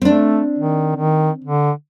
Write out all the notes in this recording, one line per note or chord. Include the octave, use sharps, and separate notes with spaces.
A3 C4 D4
D#3
D#3
D3